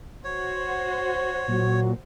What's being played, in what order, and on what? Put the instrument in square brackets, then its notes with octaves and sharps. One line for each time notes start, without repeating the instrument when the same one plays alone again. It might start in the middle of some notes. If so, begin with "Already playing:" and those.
[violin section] F#4 C5 [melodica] C#5
[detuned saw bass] A#2 [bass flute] F#3